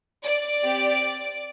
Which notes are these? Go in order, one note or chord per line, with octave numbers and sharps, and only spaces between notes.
D5
C4 G4